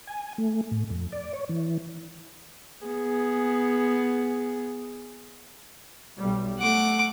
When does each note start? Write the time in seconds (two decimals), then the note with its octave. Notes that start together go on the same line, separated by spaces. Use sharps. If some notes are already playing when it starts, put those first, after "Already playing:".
0.07 G#5
0.38 A3
0.71 A2
0.90 F2
1.12 D5
1.33 C#5
1.49 E3
2.87 B3 G#4
6.17 B1 G3
6.59 A3 F#5 D6